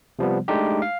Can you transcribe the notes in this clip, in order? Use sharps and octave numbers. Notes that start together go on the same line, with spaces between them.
C3 F3 G3 B3
G#3 A3 D4 D#4 G4
F5